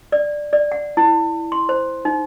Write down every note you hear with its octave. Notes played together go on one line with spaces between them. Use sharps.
D5
D5
F#5
E4
C6
C5
D#4